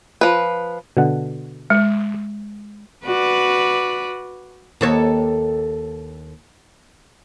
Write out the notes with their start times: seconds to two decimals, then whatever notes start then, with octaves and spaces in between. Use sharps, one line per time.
0.21 F3 B4
0.97 B2 D3 F#5
1.70 G#3
3.05 F#4 B4 D5
4.81 D#2 A4 C#5